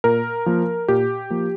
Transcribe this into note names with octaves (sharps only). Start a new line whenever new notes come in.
A#2 A#4
F3 A#3
A#2 G4
F3 A#3